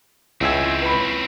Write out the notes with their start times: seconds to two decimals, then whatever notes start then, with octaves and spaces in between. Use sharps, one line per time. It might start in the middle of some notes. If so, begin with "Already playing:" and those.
0.41 C#2 C4 C#4 E4 E5 G#5 E6
0.82 B4 B5